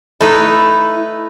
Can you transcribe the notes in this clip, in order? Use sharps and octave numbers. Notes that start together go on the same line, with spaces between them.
A3 D#4 E4 B4